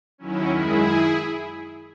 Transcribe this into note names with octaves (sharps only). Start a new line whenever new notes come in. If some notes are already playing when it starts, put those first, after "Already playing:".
D#2 D#3 F#3 C#4 E4
F#2 D#3 G#3 E4 G#4